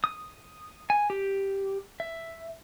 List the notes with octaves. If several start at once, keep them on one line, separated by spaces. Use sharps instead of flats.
D#6
G#5
G4
E5